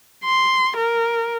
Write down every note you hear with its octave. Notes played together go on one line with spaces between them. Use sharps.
C6
A#4